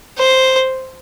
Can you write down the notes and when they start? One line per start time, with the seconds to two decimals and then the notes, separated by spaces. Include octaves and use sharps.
0.18 C5